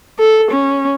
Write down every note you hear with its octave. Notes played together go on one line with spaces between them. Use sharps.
A4
C#4